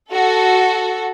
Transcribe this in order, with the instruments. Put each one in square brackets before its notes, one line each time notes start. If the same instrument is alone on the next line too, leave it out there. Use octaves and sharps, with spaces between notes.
[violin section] F#4 A4